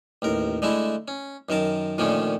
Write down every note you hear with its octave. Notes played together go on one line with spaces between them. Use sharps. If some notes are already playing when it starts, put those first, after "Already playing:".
A1 D#2 A#4
D3 G#3 A3 E4 E5
C#4
F#2 D#3 A#4 A5
A#2 D3 D#3 F3 A3 C#4